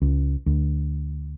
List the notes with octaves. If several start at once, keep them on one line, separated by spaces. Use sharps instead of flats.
C#2
D2